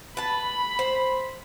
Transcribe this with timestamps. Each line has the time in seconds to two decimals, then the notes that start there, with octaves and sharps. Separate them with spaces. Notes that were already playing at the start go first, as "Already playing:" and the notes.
0.17 B4 A5 B5
0.79 C5